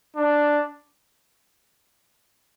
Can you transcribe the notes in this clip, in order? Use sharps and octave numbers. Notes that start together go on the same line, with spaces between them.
D4